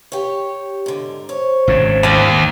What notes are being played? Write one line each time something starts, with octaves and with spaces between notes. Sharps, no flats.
G4 C#5
G#2 D3
C5 C#5
G#1 G#2 C#3
D#2 F3 B3 D4